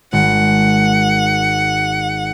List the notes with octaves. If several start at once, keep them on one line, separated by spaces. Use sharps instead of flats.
G#1 F#5